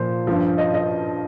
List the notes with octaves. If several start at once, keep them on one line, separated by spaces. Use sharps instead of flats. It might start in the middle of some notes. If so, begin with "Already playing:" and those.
Already playing: A#2 F3 C5
G2 F3
D#5
D#5